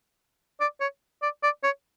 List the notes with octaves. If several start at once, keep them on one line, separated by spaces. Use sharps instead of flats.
D5
C#5
D5
D5
C#5